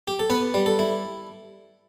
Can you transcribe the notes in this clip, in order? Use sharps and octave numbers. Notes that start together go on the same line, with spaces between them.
G4
A4
B3 B4
G3
A4
E4